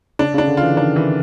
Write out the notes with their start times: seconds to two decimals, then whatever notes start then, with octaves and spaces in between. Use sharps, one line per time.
0.19 C#3 D4
0.34 C#3
0.38 D4
0.48 D3
0.57 F4
0.63 E3
0.77 D#3 D4
0.96 E3